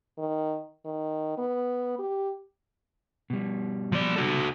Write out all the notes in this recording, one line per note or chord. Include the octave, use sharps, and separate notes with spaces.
D#3
D#3
B3
G4
B2 G3
F3 D5
F#4 A4